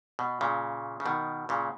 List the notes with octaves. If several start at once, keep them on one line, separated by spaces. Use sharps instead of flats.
B2
A#2 C#3
C#3
B2 D#3
A#2 C#3